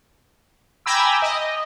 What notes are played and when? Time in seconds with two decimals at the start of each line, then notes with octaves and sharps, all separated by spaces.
0.86 G5 G#5 A#5 B5 D6 E6
1.22 D#5